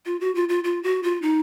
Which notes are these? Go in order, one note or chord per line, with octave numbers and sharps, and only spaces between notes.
F4
F#4
F4
F4
F4
F#4
F4
D#4